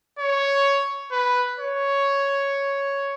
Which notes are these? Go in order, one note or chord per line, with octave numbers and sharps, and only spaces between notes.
C#5
B4
C#5